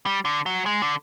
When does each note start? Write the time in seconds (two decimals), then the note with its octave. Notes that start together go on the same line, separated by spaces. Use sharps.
0.06 G3
0.25 D3
0.46 F#3
0.66 G#3
0.82 D3